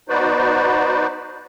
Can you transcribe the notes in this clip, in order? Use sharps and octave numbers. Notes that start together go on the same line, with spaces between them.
B3 D#4 F#4 B4 C5 D5